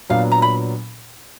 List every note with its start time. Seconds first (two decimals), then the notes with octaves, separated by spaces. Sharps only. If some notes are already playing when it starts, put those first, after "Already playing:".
0.09 A#2 F#3 B3 D4 F5
0.32 A#5
0.42 B5